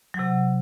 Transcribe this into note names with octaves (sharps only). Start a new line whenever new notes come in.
C3 F#3 F#5